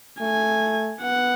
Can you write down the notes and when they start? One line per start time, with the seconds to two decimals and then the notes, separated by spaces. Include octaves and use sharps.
0.21 A3 G#5
1.02 B3 F#5